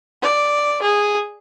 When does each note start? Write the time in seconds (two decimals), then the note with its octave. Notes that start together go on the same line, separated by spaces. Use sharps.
0.23 D5
0.82 G#4